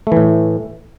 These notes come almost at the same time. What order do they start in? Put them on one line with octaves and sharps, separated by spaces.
A3 E3 A2